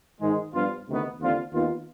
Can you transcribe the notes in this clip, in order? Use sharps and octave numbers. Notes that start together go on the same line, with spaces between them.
G#2 D#3 G#3
G2 F3 B3 D4 F4
D2 C3 D#3 B3
D#2 D3 F3 C4 F4
D#2 D#3 B3 F4